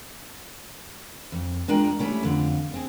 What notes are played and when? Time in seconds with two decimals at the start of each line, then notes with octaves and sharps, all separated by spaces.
1.32 F2
1.68 G#3 D4 F4 A#4 G5
1.99 G3 A3 C#4 E4
2.23 F2 D3 F4
2.74 C4 G#4